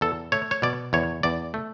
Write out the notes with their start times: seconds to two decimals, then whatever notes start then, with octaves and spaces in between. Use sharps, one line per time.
0.01 E2 A4
0.32 A3 C#5
0.51 C#5
0.62 B2 D5
0.93 E2 C#5
1.23 E2 D5
1.54 A3